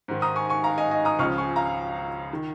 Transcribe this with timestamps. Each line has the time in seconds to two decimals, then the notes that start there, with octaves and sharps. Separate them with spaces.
0.08 G#2 D#3
0.22 A#5 D#6
0.36 G#5 C#6
0.50 G#5 C#6
0.64 F5 A#5
0.78 D#5 G#5
0.91 D#5 G#5
1.05 A#5 D#6
1.19 C#2 C#3 F3 C#6 F6
1.38 G#5 C#6
1.56 F5 A#5
2.33 D#3